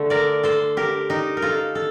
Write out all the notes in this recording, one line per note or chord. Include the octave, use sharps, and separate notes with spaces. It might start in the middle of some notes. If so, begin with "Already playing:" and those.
Already playing: D3 A3
A#4 D5
A4 C5
G4 A#4
D#4 G4
A#4
F4 A4
A4